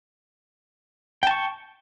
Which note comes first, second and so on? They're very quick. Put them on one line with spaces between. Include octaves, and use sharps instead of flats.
G5 A5 C#6